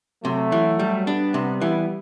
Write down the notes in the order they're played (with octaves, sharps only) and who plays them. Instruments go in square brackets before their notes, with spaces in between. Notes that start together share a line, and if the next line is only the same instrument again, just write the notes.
[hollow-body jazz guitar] C3 [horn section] F#3 A3
[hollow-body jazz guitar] E3
G3
[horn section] G3 B3 [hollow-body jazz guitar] D4
[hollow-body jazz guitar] C3
E3